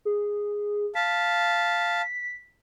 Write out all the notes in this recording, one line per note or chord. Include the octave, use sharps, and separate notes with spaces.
G#4
F5 A5 B6